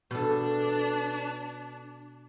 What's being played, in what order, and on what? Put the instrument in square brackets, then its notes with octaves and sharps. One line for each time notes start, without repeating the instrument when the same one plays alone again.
[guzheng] B2 A4 [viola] D4